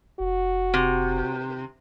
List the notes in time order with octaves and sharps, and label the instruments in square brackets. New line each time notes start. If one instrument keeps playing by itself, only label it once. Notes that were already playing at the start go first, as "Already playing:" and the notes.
[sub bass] F1 [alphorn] F#4
[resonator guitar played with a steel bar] C3